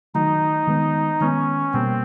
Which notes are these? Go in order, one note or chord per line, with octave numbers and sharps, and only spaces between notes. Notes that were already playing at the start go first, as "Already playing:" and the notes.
D#3 F#3 A3 D#4
D#3 G#3 B3
D#3 G#3 B3 C#4
B2 G3 A#3 C4